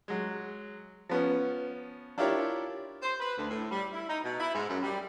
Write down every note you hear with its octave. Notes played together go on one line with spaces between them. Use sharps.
F#3 G#3
F3 B3 C#4
D4 E4 F4 G4 A#4 C#5
C5
B4
D2
A2
G3
E4
D#4
B2
E4
G#2
F#2
G3